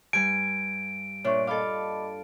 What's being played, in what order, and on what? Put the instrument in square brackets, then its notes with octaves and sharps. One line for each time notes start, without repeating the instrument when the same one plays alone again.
[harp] G2 G#5 [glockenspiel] D7
[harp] A#2 D4 [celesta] C#5 E5 C#6
[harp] A4 F5 [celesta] D#5 B5 D6